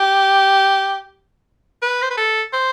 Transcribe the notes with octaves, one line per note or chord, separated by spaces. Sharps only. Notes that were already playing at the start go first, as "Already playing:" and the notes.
Already playing: G4
B4
C5
B4
A4
C5